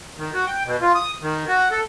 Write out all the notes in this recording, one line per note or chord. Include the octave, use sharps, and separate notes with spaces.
D#3
F#4
G5
B2
F4
D#6
D#3
F#4
A4